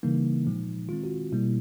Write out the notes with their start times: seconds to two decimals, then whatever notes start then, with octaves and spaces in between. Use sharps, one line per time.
0.03 C#3 E3 G3 A#3 D#4
0.47 A#2 F3 G#3
0.89 D#3 G#3 C4 F4
1.04 F#4
1.32 B2 G3 A#3 E4